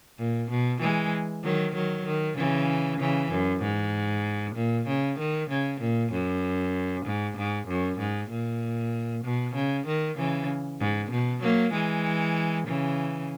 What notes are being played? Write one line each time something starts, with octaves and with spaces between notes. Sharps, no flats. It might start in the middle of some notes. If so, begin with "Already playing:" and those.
A#2
B2
E3 G#3
D#3 F#3
D#3 F#3
D#3
C#3 E3
C#3 E3
F#2
G#2
A#2
C#3
D#3
C#3
A#2
F#2
G#2
G#2
F#2
G#2
A#2
B2
C#3
D#3
C#3 E3
G#2
B2
F#3 A#3
E3 G#3
C#3 E3